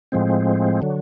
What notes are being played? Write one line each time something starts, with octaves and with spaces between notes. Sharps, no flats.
A2 F3 G#3 C4
D3 F#3